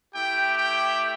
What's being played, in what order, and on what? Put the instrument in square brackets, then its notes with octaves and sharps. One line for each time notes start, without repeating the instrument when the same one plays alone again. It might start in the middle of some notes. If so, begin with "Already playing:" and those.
[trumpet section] A3 E4 G4 G5
G5